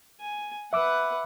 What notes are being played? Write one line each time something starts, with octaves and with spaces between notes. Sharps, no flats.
G#5
B4 E5 F#5 D6 E6